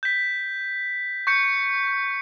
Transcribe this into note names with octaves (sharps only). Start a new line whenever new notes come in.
G6 B6
C#6 G6 C#7